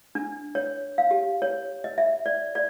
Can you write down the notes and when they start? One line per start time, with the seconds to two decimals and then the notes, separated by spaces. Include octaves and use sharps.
0.15 D4
0.55 C#5
0.98 F5
1.11 G4
1.42 C#5
1.84 D#5
1.98 E5
2.26 D5
2.55 D5